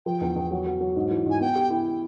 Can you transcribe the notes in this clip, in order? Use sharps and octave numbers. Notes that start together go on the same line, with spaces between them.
F3 G5
E2
E2
F#3
F#3
F#3
G#2
E3
G#2 G#5
B3 G5
G4
E4